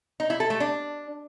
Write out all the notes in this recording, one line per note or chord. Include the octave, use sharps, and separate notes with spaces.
D#4
E4
A4
A3
D4